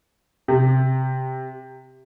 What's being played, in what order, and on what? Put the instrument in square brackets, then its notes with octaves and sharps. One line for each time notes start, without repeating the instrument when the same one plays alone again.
[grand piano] C3